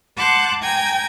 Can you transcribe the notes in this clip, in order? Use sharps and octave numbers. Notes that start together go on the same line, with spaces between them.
F#5 A5 C6 D6 F#6 G6
G5 G#5 A#5 G#6